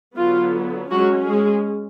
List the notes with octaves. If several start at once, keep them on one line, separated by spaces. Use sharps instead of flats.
D3 F#3 B3 F4
F#3 G#3 C#4 F#4
G#3 G#4